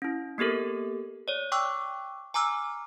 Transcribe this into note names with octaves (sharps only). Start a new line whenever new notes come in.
C#4 E4
A#3 B3 G4 A4 A#4
C#5 D5
G5 C#6 D6 E6 F#6
G#5 A#5 D6 E6 F6